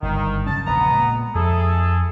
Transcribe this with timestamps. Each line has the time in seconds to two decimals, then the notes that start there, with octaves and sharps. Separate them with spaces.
0.02 G1 G#2 D#3
0.46 C#3 F#3 C#4 A5
0.66 E1 A#1 C#3 B3 A#5
0.92 A#2 G#3
1.35 F2 E4 G#4 A4